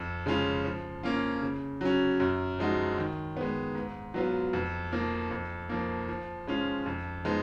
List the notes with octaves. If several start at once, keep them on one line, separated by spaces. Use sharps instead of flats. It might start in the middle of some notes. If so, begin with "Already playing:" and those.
Already playing: F2
C#3 G#3 C#4 F4
F3
A#3 C#4 F4
C#3
F#3 C#4
F#2
F3 G#3 D#4 F#4
D#3
G#3 B3
G#2
F#3 B3 F4
F2
F3 A#3
F2
F3 A#3
F3
G#3 C#4 F4
F2
F3 G#3 B3 D#4